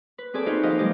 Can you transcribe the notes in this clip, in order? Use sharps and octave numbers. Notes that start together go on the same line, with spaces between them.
B4
C4 G#4 A4 D5
D#4 F4 F#4 B4 C5 D#5
D#2 F3 F4 G4 D#5 F5
F3 G3 G#3 G4 D#5